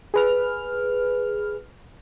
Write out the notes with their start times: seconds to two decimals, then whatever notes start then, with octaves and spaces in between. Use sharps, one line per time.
0.14 G#4 B4 F6